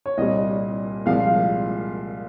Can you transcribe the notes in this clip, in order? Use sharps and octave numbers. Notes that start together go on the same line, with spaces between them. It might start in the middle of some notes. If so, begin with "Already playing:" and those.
C#5
C2 A#2 G3 D#5
C2 A#2 F3 G#3 F5